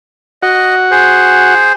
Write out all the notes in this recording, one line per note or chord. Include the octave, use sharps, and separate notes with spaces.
F#4 D#5 F#5
G#4 C5